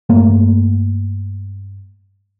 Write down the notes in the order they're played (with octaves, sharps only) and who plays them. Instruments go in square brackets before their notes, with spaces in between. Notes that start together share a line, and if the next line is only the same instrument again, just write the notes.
[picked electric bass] G2 A3 A#3